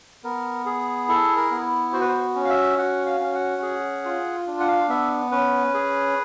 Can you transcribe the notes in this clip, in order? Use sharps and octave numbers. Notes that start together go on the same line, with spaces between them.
B3 A#4
G#4
E4 A4
A#4
B3
F#4 C5
B4
C5
C#4
F5
E5
F#4 F#5
F5
C#4
F#5
G#4
F4
D4
F#5
F5
B3 E5
C#4 B4
G#4